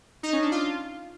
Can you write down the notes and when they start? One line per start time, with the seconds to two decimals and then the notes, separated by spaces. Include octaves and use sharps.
0.23 D#4
0.33 C#4
0.42 D4
0.52 F4